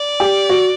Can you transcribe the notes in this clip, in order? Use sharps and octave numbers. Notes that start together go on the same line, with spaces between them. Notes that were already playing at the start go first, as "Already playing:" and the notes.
Already playing: D5
G4
F#4